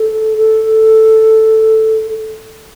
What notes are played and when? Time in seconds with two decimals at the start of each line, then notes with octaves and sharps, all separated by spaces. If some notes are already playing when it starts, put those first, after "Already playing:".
Already playing: A4
0.38 A4